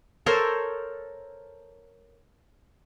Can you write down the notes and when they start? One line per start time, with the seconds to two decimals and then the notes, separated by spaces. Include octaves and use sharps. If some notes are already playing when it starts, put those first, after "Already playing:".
0.26 A4 A#4 C5 C#5